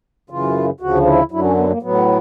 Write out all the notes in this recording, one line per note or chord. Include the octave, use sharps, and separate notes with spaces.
F#2 C#3 E3 F4
D2 C#3 F3 F#4
E4
F#2 D3 F#3 E4
C#4
B3
A#3
A2 F#3 B3